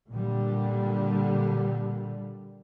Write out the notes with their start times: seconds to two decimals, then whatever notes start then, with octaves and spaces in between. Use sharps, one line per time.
0.10 A#2 D3 G3